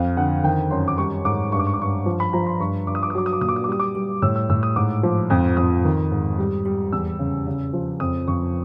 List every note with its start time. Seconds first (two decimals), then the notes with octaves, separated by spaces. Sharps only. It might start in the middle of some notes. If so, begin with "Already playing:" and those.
Already playing: F2 F5
0.17 D3 F#5
0.44 D#3 G5
0.71 F#2 C6
0.88 D6
0.98 G3 C#6
1.25 G#2 D6
1.52 G2 C#6
1.59 D6
1.67 C#6
1.74 D6
1.79 G2 C#6
2.06 F3
2.20 B5
2.33 F3 A#5
2.47 C6
2.60 G2 C#6
2.87 G2 D6
2.95 D#6
3.03 D6
3.10 D#6
3.15 F#3 D6
3.26 D#6
3.33 D6
3.41 A#2 D#6
3.49 D6
3.56 D#6
3.64 D6
3.68 G3 D#6
3.80 D6
3.95 G3
4.22 A2 E6
4.36 E6
4.49 A2 E6
4.63 D#6
4.76 G#2 D6
5.03 F3
5.30 F2 D#6
5.57 F2 D#6
5.84 D#3
6.11 G#2
6.38 G3
6.65 G3
6.92 E2 E6
7.19 C#3
7.47 C#3
7.73 F3
8.00 F2 D#6
8.28 F2 C#6